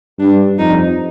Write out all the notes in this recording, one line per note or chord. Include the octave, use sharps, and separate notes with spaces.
G2 D4
F2 D#4